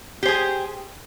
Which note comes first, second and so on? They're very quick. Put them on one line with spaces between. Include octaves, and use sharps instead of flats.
G4 C5 G#4